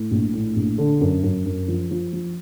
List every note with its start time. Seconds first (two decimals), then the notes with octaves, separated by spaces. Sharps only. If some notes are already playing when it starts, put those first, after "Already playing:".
Already playing: A2
0.11 A#1
0.33 A2
0.56 A#1
0.78 D3
1.01 F#2
1.23 F#2
1.46 F#2
1.68 F3
1.91 F3
2.13 F3